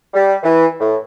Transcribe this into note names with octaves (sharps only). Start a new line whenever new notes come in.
G3
E3
A2